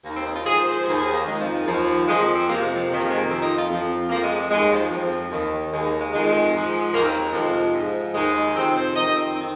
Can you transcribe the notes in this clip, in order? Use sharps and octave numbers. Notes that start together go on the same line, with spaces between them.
D#2 D#3 A#3
C4
D#4
F4
G#2 F3 G#4
C5
C5
D#2 D#3 G#4
G#4
A#3
F2 D#3 G#3
F3
G#3
D#2 D#3 F3
F2 F3 G#3
A#3
C4
F2 C3 F3 A#3
G#3
F3
F2 C3 D#3
F3
G#3
A#3
F2 F3 C4
D#4
F4
F2 F3
F2 F3 A#3
G#3
G#3
D#2 D#3 G#3
F3
F2 F3
D#2 D#3
D#2 D#3 G#3
A#3
G#3
F2 D#3 G#3
G#2 F3
D#2 D#3 A#3
C4
G#3
F2 C3 F3
G#2 F3
D#2 D#3 G#3
F2 C3 D#3 C4
C5
F2 D#3 D#5
C4
D#3 C4